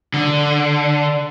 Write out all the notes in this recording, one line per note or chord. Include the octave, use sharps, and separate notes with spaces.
D3